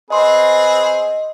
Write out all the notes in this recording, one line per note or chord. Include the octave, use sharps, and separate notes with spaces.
C4 G#4 B4 D#5 C6